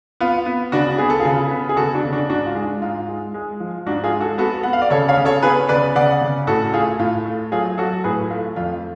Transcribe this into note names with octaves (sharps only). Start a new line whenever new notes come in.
B3 F4
B3
C#3 D4 F#4
B3 G#4
A4
F4 G#4
C#3
B3
G#4
C#3 F#4 A4
D4 F#4
C#3
D4 F#4
G#2 D4 F#4
F4
G#3
D4
G#2 F4
G#3
G#3
F3
G#2 D4 F#4
F4 G#4
G#3
F#4 A4
B3 F#4 A4
B3 F#5
F5
D5
C#3 A4 C#5
C#5 F5
C#3
A4 C#5
B3 G#4 B4
C#3 B4 D5
C#3 D5 F#5
C#3
A2 F#4 A4
A3 F4 G#4
A2 F4
A3
F#3 F4 G#4
F#3 F#4 A4
A2 G#4 B4
A3 F4
F2 F4